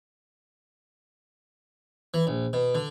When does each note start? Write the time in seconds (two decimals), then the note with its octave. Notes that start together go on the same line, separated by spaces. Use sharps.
2.14 E3
2.27 A#1
2.53 B2
2.75 D3